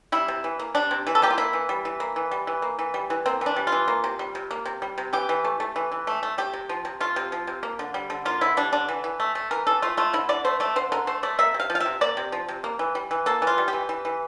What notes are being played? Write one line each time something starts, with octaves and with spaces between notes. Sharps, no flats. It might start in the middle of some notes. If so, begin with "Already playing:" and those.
G3 E4
C3
E3
A#3
G3 D4
C3
E3 E4
A4
A#3 G4
F4
A#3 E4
E3
G3
E3
A#3
E3
G3
E3
A#3
E3
G3
E3
A#3 C4
E3 D4
G3
F4
E3
A#3
C3
G3
C3
A#3
C3
G3
C3
E3 G4
E3
A3
A3
E3
E3
A3
A3
A3 G4
C3
F3
C3
A3 F4
C3
F3
C3
A#3
D3
G3
D3
A#3 F4
D3 E4
G3 D4
D3 D4
E3
E3
A3
A3
E3 A#4
E3 A4
A3 F4
A3 F4
D3 E4
D3 D5
A3 C5
A3 D5
D3 C5
D3 A#4
A3 C5
A3 D5
A#3 E5
C3
F5
F3
F5
E5
C3
A#3 D5
C3
F3
C3
A#3
E3
G3
E3
A#3 A4
E3
F4
G3
G4
E3
E3
E3